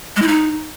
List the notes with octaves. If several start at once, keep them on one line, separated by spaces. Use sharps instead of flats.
G#3
E4
D#4